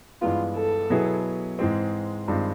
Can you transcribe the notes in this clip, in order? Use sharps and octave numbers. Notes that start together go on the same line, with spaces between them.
G2 E3 G#3 B3 F4
A4
B2 F#3 B3 E4 G#4
G#2 E3 G#3 C4
G2 D#3 G#3 C4 F4